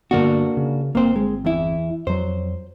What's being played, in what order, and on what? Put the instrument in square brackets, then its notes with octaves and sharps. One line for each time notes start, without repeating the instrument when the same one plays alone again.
[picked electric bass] G2 D3 B3 [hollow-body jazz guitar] A#3 D4 F#4
[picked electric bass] C#3
[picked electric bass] G1 C4 [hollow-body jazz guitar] A#3 C5
[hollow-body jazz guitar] G#3
E2 E4
[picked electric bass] F2 F#3 [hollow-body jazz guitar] C5